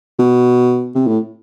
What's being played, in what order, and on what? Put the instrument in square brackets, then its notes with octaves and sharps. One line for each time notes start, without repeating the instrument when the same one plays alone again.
[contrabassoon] B2
C3
A2